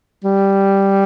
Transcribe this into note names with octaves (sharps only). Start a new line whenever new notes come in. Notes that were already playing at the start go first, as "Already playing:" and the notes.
G3